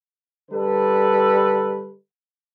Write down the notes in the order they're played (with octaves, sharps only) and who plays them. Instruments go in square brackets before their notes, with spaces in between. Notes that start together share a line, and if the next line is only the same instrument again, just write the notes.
[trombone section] D3 G3 A4 B4